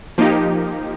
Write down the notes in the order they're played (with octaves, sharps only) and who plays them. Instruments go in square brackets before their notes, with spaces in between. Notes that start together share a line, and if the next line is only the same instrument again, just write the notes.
[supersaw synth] F3 A#3 D#4 G4